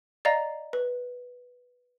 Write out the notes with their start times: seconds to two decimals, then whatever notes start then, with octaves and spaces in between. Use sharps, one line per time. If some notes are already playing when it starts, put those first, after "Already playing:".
0.25 D5 D#5 F5 A#5
0.73 B4